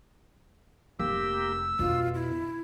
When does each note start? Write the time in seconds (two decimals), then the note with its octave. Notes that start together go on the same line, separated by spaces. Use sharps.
1.00 F1 A#3 G4 E6
1.79 F2 B2 D3 F4
2.15 E4